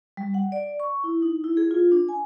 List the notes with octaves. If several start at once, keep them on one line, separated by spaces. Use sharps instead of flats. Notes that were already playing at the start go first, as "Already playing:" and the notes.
G3
F#5
D5
C#6
E4
D#4
E4
G#4
F4
D4
G#5